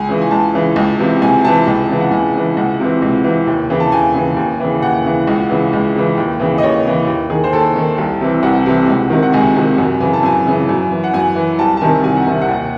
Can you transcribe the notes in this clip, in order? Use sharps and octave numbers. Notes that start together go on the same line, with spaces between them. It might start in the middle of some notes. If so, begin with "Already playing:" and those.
Already playing: C#2 G#5
C#3 E3
G#5
C#2 A5
C#3 E3
C#2
C3 E3
C#2 G#5
C3 E3 A5
C#2
C#3 E3
F#5
C#2 G#5
C#3 E3
C#2 F#5
C3 E3
C#2
C3 E3
D#2
C#3 E3
A5
D#2 G#5
C#3 E3
D#2
C#3 E3
D#2 F#5
C#3 E3
C#2
C#3 E3
C#2
C#3 E3
D#2
C#3 E3
D#5
D#2 C#5
C#3 E3
D#2
D#3 G#4
C5
D#2 A4
D#3
C2
C3 E3
C2 F#5
C3 E3
C#2
C3 D#3
F#5
C#2 G#5
C3 D#3
F#2
C#3 E3 G#5
A5
F#2 G#5
C#3 E3
F#2
E3
F#5
F#2 G#5
E3
C2 A5
A5
C3 D#3 G#5
C2 G#5
F#5
C3 D#3 E5
F#5
D#2